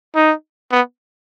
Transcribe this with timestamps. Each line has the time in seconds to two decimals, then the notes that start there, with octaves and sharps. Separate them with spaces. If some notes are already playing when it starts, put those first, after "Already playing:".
0.16 D#4
0.72 B3